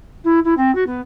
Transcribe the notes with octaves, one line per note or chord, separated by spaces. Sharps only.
E4
E4
C4
F#4
B3